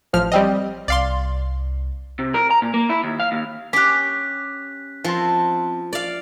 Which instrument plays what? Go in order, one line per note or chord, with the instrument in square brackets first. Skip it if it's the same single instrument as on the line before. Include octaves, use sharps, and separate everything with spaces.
[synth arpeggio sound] A1 F3 F6
G3 C4 D#5
[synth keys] C2 [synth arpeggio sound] D5 F5 C6
[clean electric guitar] C3
A#4
A#5
A#2
A#3
E4
D#2
F5
D#2
[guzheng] C#4 G4 [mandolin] D6 [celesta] F#6 B6
[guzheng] F3 [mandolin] C4 A5
[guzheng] D5 F5